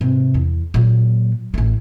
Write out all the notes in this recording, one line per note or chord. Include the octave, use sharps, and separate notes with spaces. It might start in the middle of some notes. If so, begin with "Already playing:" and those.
G#2 C3
E2
A#2 F#3
A1 A3